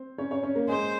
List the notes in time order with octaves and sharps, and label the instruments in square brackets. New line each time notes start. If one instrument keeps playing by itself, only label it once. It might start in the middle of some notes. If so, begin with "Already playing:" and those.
Already playing: [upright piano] C4 C5
C#4 C#5
C#4 C#5
C#4 C#5
A#3 A#4
[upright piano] G#3 G#4 [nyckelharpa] C5